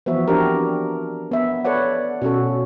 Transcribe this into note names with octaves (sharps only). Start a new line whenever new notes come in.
E3 F3 B3 F#4 E5
C4 D4 F#4 G4 A#4
B3 E5
A4 B4 C#5 D5 F#5
B2 C#4 F#4 A4